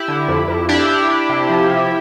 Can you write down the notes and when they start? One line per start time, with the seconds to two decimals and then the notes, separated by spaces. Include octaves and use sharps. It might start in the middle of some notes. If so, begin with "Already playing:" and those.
Already playing: E4 G4
0.08 D3
0.28 F2
0.48 F2
0.69 D4 E4 G4
0.89 D4
1.10 D4
1.29 C3
1.49 F3
1.70 C3